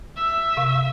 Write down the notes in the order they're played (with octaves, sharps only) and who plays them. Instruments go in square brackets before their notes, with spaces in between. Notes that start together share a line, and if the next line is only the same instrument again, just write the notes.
[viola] E5
[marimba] C3 F5